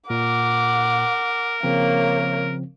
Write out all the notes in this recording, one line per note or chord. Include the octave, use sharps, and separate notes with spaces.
A#2 A#4 F#5 D6
C#3 F3 A#3 C4 C#5